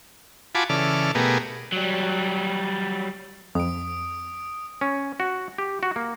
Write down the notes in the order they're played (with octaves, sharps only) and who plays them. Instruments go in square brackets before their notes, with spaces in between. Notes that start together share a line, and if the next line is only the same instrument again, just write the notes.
[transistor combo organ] F4 F#4 G#5 A5 B5 D6
C#3 E3 A4 D5 F6
B2 A3 B3 G4 G#4 A#4
[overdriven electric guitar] F#3 G3
[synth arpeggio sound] F2 [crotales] D#6 D7
[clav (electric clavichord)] C#4
F#4
G4
F#4
A#3